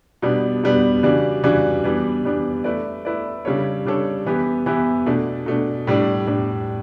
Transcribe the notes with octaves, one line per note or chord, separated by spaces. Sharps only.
B2 G3 B3 D4
B2 G3 B3 D4
C#3 E3 G3 D4 F#4
C#3 E3 G3 D4 F#4
E3 G3 B3 D4
E3 G3 B3 D4
A3 E4 B4 D5
A3 E4 B4 D5
C#3 G3 D4 A4 C#5
C#3 G3 D4 A4 C#5
E3 B3 E4 G4
E3 B3 E4 G4
B2 A3 D4
B2 A3 D4
A2 G3 D4
A2 G3 D4